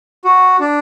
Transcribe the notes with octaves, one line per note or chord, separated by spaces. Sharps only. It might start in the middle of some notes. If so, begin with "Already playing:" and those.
F#4
D4